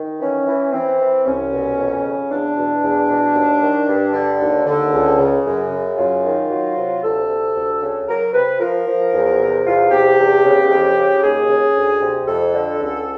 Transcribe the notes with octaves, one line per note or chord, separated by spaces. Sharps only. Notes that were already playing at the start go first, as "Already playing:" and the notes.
Already playing: D#3
E3 C#4
E3
E3 C4
E3
C2 C#4
B2
F2
C#3
E2 D4
B2
E2
B2
D#2
D#3
G2
D3
D#2
D3
C#2
C#3
F#2
C#3
F#2 F4
D#3
F#3
C3
D2 A4
C3
D2
C#3
F#3 A#4
C3 B4
F3 A#4
F3
E2
C3
E2 F4
C3 G4
E2
C#3
F2
C#3
D#2 G#4
C#3
D2
C3
F2 A4
D3
C#2